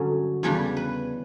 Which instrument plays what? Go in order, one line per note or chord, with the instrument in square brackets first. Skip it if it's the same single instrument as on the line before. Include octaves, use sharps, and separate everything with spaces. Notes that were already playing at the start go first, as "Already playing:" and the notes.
Already playing: [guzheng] G2 D3 F#3 C#4
E2 C#3 G3 D4 C#5
B4